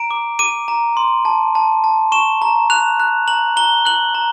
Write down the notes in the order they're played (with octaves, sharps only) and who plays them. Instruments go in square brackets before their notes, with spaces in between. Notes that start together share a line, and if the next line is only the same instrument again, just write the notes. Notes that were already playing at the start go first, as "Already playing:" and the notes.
Already playing: [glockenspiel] A#5 D7
D6
D6 D#7
A#5
C6
A5
A5
A5
C#6 E7
A#5
F#6 F7
F#6
A#5 F#7
A#5 G7
F#6 F#7
A#5